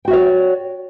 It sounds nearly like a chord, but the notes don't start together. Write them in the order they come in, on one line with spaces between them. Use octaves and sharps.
G5 F#4 E5 C#5 D5